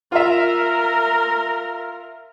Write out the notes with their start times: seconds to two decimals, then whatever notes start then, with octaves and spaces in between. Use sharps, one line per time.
0.12 F4 A#4 E5